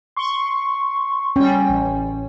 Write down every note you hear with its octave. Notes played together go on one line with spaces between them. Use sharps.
C6 C#6
G3 C#4 G5
A1